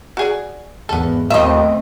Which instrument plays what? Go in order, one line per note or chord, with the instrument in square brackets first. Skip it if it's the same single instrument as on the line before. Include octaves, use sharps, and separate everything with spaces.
[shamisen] F#4 G#4 D5
[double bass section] G#1 E2 [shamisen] B3 A4
[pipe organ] D#2 D#3 [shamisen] F3 A#3 [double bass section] A3 C4 [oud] D#5 E5